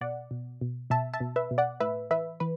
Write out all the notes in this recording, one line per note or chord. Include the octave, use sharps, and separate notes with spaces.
B2 D5 F#5
B2
B2
B2 E5 A5
E5 A5
B2
B4 E5
B2
D5 F#5
A2 B4 E5
E3 B4 E5
E3 B4